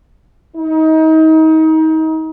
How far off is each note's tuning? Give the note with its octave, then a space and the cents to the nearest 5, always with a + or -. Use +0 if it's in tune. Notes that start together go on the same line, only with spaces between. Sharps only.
D#4 +30